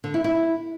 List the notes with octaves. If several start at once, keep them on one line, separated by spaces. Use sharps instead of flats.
D3
E4
E4